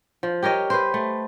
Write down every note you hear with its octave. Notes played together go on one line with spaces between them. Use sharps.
F3
G4 A#4 C#5 D#5
B4 C5
A3